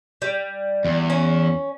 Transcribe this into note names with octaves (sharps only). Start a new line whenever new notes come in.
G3
E2
C#4